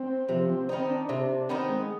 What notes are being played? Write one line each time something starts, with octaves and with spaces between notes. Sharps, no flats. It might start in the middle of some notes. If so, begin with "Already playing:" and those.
Already playing: C4
C3 F3
C4
D#3 B3 C4 D#4
D4
C3 D4
D4
D#3 B3 C4 D#4
G#3